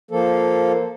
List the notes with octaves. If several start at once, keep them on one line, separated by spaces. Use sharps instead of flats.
F3 A#3 A4